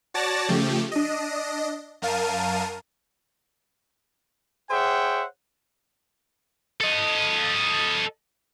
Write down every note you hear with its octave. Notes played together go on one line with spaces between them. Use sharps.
F#4 C#5 D5 A5 A6 A#6
C#3 F3 A3 G4
D4 D#5
F#2 A#4 F5 A5 D#7
G#4 C5 C#5 E5 F#5 G5
A4 D#5